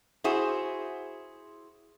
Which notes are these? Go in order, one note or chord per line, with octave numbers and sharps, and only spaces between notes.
E4 F#4 G#4 C5